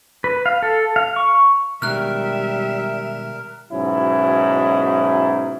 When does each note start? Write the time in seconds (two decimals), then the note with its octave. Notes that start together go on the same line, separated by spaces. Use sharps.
0.24 B4
0.46 F5
0.62 A4
0.96 F5
1.16 C#6
1.82 B2 D#3 G3 G#3 A#4 E5 F6 F#6
3.71 G#2 B2 F#3 C#4 D#4 E4